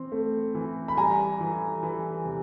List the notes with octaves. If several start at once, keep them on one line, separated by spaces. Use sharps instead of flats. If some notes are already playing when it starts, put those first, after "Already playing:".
Already playing: E3 C4
A3
E3
B5
G3 G#5 A#5
E3
E3
C3